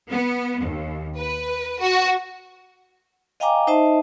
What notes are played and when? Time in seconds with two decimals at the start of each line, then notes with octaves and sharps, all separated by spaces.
0.10 B3
0.63 D#2
1.17 B4
1.81 F#4
3.40 D#5 F5 G5 G#5 A#5 D6
3.67 D#4 C5 D#5 E5 A5